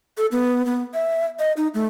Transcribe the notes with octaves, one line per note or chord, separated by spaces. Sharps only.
A4
B3
B3
E5
D#5
D#4
A3